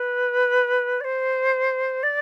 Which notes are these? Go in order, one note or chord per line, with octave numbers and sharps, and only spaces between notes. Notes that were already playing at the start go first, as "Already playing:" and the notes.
Already playing: B4
D5
C5
D5